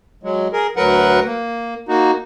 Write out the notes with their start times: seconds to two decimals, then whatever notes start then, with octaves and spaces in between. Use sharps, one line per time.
0.23 F#3 G#3
0.53 G#4 A#4
0.76 D2 F#3 A#4 B4 F#5
1.25 A#3
1.88 A#3 D#4 F#4